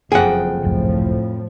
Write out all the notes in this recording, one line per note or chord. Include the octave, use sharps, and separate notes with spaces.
F#1 F2 G#4 F#5 G5
G#1 C#2 F#2 A2 F3